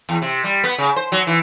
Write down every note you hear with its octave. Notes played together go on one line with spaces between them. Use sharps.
E2
C3
G3
B3
C#3
C5
F#3
E3